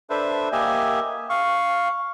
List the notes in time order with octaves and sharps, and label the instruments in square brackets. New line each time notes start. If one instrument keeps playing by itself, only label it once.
[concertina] D4 A4 B4 C5 E5
A#3 G4 D#5 E5 G#5
F5 C#6